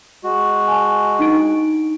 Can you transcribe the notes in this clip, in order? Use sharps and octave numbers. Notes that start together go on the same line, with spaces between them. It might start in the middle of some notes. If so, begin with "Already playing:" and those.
G#3 F#4
G#5 A5
D4 D#4 D7